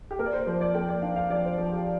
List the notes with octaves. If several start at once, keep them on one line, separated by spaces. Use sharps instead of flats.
G4
A#3 A#4
D5
C5
F3 C5
D5
A#3 G5
D5
D4 F5
F5
F3 D5
C5
F3
G4